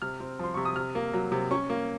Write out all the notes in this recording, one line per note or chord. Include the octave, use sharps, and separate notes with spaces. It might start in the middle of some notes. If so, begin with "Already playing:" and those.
C3 F6
C4
F3 C6
C3 C#6
D#6
C3 F6
A#3
F#3
C3
C#4 C#6
A#3